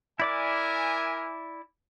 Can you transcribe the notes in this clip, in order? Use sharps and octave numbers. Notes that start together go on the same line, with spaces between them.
E4 A#4 D5 E5 G#5 D6